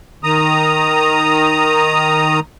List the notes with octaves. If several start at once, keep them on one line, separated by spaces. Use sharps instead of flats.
D#3 A#5 D#6